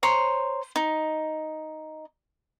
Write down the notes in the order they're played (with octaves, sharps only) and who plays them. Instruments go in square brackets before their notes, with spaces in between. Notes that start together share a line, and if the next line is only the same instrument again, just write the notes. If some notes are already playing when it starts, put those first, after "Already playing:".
[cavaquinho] C5 C#5 A#5
D#4